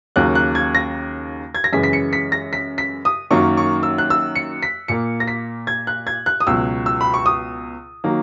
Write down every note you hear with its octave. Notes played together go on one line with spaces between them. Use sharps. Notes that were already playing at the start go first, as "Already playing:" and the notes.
D#2 C#3 F#3 A#3 F#6
F#6
G#6
A#6
G#6
A#6
F#2 C#3 E3 G#3 B6
B6
C#7
B6
A#6
B6
B6
D#6
F#2 D#3 F#3 A#3 C#6
C#6
E6
F#6
E6
C#7
B6
A#2 A#3 C#7
A#6
B6
G#6
F#6
G#6
F#6
D#6
C#2 B2 F#3 E6
E6
B5
C#6
D#6
D#3 F#3 A#3